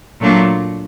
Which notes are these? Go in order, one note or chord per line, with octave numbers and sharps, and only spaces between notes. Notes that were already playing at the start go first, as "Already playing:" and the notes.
A#2 F#3 A3 D4 F4